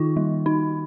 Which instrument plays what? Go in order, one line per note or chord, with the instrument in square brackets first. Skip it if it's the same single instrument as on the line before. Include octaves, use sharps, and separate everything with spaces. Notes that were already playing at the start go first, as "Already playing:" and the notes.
Already playing: [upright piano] D#3 [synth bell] F4
[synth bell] G3
D#4